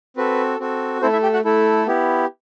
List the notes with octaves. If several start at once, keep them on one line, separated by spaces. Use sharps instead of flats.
C4 F#4 A4 B4
C4 F#4 A4
A3 C4 E4 A4 C5
E4 E5
G4 G5
F#4 F#5
A3 E4 A4
B3 E4 G4